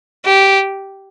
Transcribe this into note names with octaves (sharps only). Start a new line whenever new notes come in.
G4